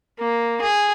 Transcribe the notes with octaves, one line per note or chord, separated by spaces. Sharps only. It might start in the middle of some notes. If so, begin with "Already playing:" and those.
A#3
G#4